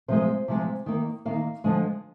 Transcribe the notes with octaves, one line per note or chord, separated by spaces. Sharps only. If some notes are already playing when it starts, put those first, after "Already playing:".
C3 F3 G#3 C5
C3 F3 G#3
D#3 A#3
D#3 A#3 F5
D3 F3 G#3